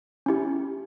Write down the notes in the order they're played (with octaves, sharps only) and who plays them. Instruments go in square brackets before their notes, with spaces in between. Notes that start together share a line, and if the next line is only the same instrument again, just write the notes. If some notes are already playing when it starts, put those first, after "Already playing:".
[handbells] C#4 E4 G4